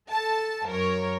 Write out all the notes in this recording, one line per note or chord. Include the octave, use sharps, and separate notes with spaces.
A4 A5
F#2 A#4 C#5